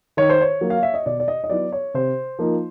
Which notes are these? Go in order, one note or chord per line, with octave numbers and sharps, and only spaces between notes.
D#3 C#5
C5
C#5
F#3 A#3
F5
E5
D#5
B2 D5
D5
D#5
D#5
F#3 B3 E4 D5
C#5
C3 C5
F3 A#3 D#4